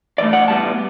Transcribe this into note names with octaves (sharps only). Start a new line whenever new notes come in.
G2 E3 A3 D5
F#5
A2 G3 B3 A5